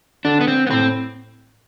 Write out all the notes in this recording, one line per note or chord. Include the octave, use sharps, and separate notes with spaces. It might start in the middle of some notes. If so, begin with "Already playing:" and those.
D3 D4
B3
C4
B3
A2 C4